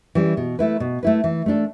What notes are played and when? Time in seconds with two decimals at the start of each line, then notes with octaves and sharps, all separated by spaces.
0.15 E3 G3 C#4
0.37 B2
0.59 A3 E4 B4
0.80 B2
1.03 A3 E4 B4
1.24 E3
1.46 A3 D4 A4